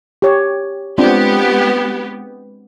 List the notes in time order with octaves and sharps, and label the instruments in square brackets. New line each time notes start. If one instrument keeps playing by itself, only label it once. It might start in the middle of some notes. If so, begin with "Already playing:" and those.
[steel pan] G4 C#5
[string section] G#3 B3 G4 [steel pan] C4 D4 F4